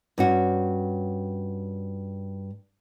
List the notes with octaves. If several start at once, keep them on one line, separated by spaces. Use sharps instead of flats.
G2 C#4 F#4